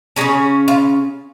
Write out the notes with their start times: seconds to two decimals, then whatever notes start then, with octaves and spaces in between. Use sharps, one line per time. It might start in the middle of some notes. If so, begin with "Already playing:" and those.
0.16 C#3 A#3 C#4 G#4 C#5
0.68 F4